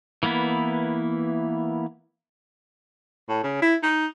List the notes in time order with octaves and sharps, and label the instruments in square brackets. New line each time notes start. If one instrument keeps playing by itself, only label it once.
[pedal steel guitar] E3 A#3 B3 E4
[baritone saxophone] A2
C#3
E4
D#4